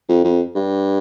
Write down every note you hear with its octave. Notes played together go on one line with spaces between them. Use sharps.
F2
F2
G2